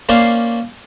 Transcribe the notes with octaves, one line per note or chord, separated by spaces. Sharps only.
A#3 C#4 C5 D5 F5